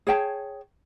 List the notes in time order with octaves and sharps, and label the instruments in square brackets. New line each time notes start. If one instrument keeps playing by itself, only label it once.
[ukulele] G#4 C#5 G5 A5